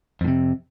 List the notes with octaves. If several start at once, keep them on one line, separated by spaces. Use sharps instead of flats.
F2 A2 C3